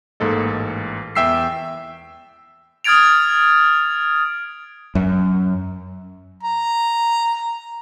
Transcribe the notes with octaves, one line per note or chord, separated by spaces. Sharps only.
A1 G#2 A#3 A4 D#5
E2 E5 G5 E6 B6 C7
D#6 F6 G#6 A6 D7 F7
F#2
A#5